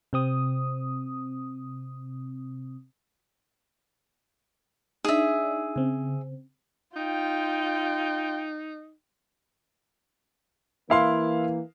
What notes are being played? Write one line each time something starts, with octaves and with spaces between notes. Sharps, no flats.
C3 C4 D#6
D4 D#4 G#4 E5
C#3 C4
D#4 F4 G5
E3 A#3 E4 F5 C6